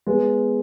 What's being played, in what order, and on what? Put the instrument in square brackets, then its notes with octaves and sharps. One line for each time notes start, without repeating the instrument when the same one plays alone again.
[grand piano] G#3 B3